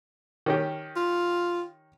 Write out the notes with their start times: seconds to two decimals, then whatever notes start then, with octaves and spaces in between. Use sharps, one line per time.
0.46 D#3 C#4 G4
0.96 F4